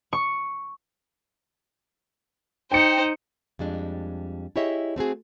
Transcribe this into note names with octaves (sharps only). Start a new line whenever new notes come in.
C#6
D#4 C5 G5 C#7
F2 G3 G#3 D4
E4 G4 G#4 C#5 D#5 E5
A3 C4 F#4 G#4